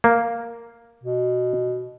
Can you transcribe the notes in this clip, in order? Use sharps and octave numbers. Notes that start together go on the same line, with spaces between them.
A#3
B2